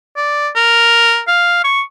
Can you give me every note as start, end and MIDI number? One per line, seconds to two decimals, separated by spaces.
0.16 0.49 74
0.56 1.21 70
1.28 1.61 77
1.64 1.81 85